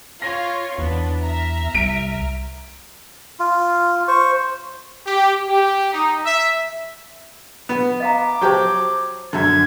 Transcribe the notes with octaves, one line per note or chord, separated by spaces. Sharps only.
F4 C#5 A#6
E2 B3 D4
E5 A#5 F6
C2 D7
F4
C5 C#6
G4
G4
D#4
E5
B3
D#5 F5 A#5 D6
F#3 G4 C5 G5 A5 C#6
F#2 D3 G#6